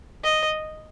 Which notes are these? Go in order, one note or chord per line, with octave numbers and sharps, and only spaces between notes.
D#5